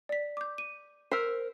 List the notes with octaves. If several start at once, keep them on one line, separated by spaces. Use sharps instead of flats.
D5 B6
D6 G6
D#7
A#4 C5 E6 B6 C7